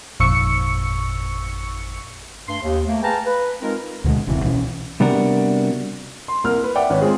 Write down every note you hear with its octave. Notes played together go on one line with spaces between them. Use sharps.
G#1 F2 A#2 C#6 E6 C#7
G2 A3 C6
D#2
A3 A#3
G#4 B4 F5 G5 A5 A#5
B4
G#3 C4 D#4 F4 A#4
D2 B2 D3 G#3
D#1 A1 C3 E3
C2 B2 E3 C#4
C3 G3 B3 D4 F#4 A#4
C6
C2 A#3 A#4 F6
B4
D5 E5 F#5 G5 D6
G#1 B4 C#5
G#3 C4 F4 G#4